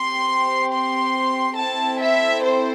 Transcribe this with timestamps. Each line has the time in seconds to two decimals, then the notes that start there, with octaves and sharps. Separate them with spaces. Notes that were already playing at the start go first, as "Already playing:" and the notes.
Already playing: C4 G4 C6
0.71 C6
1.57 C4 E4 A4 A5
2.00 E5
2.43 C5